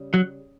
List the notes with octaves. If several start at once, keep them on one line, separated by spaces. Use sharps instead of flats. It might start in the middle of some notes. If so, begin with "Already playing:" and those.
Already playing: C#3 G3
F#3